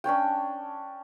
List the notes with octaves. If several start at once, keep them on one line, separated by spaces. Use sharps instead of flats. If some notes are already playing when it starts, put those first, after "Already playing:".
C#4 D4 C#5 G5